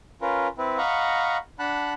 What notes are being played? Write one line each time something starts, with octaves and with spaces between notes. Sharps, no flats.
C#4 F4 A#4 B4
C4 E4 B4
D#5 F5 F#5 A#5 B5 C#6
D4 F#5 A5 B5 F#6